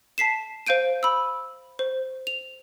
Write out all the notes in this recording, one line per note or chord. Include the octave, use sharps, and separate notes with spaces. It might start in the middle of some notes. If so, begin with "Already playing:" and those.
A5 B6 C7 E7
C5 F5 G6 D7 D#7
B5 E6
C5
F7